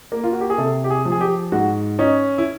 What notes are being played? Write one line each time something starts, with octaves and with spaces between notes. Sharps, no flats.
A#3
F4
F#4
G4
G#4
C3 A4
G4
G#4
F3
G#4
G4
G#2 F#4
C#4 D#4
E4